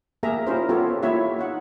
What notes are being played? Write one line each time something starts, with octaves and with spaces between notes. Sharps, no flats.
A#3 G4 G#4 A#4 E5 A#5
C#4 E4 F4 G#4 A#4 C5
B3 F4 G4 A4 C#5
A#3 E4 F4 G4 C#5 E5
D#4 F#5